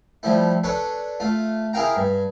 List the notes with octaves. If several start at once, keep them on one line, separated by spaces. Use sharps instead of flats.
F3 G3 A3 E4
D4 A4 B4 C#5
A3 F4
E4 G#4 A#4 F5 G5 A#5
G2